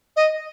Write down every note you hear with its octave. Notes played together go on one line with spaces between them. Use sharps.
D#5